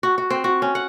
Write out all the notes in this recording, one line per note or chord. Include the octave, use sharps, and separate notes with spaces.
F#4
F#4
C4
F#4
C#4
F#5